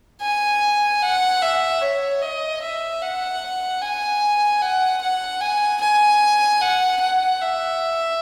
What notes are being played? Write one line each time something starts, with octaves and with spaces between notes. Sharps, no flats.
G#5
F#5
E5
C#5
D#5
E5
F#5
G#5
F#5
F#5
G#5
G#5
F#5
F#5
E5